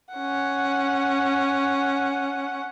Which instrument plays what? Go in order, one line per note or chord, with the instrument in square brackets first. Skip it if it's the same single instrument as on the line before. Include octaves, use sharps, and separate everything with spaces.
[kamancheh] C#4 F#5